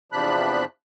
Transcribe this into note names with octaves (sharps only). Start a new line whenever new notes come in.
E2 C3 F3 D4 B5 F#6